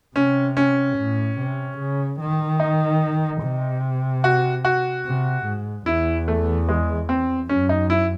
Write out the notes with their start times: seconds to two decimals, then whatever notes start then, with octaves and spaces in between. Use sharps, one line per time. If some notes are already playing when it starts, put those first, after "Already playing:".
0.16 C3 C#4
0.57 C#4
0.97 A2
1.39 C3
1.78 C#3
2.20 D#3
2.60 D#4
3.42 C3
4.24 F#4
4.65 F#4
5.05 C3
5.45 G#2
5.86 E2 E4
6.28 A3
6.69 G#3
7.09 C4
7.49 F#2 C#4
7.69 D#4
7.90 E4